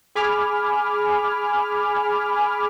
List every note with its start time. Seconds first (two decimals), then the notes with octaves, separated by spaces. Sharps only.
0.15 G#4 G#5 B5 D6 F6